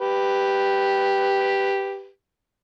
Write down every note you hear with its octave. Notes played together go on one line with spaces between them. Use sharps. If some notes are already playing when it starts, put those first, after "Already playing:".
G4 B4